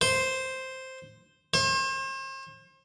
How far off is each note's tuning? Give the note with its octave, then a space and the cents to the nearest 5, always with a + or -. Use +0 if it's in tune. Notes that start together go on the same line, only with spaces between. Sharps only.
C5 +0
C5 +40